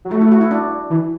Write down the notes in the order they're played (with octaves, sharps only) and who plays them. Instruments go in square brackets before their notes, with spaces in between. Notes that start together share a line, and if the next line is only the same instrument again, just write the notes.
[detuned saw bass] F#3
[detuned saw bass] A3 [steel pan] F#4
[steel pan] E4
F#4
E4
D4
[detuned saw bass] E3